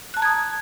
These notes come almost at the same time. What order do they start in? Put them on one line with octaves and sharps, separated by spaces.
F#6 A5 A#5 G#6 D#6